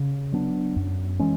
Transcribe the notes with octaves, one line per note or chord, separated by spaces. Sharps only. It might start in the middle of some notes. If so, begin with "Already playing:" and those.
Already playing: C#3
F#3 B3 D4
F#2
E3 G#3 C#4